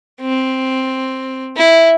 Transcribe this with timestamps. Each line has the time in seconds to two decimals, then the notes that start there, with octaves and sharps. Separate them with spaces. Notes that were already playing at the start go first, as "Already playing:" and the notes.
0.21 C4
1.56 E4